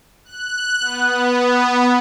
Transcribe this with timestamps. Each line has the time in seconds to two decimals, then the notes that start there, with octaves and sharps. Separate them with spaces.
0.25 F#6
0.80 B3